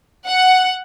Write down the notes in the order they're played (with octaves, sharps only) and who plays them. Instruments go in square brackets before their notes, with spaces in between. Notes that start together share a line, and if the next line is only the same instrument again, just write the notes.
[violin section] F#5